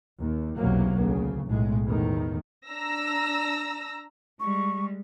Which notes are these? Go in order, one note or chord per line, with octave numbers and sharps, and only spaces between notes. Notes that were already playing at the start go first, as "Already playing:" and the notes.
D#2
B1 E2 C3 F#3 A#3
D2 C#3
B1 A2 G#3
E2 A2 D#3
D4 A#5 E6 A#6
G3 G#3 C#6